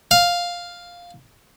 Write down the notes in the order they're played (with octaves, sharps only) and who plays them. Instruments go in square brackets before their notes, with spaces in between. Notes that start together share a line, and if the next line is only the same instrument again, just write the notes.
[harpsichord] F5